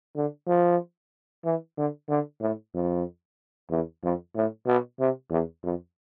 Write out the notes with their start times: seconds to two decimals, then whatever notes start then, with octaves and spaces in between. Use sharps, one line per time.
0.16 D3
0.47 F3
1.45 E3
1.77 D3
2.09 D3
2.41 A2
2.74 F2
3.70 E2
4.03 F2
4.35 A2
4.67 B2
5.00 C3
5.31 E2
5.63 F2